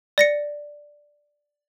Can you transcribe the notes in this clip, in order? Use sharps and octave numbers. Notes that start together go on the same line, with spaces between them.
D5 A#6 C#7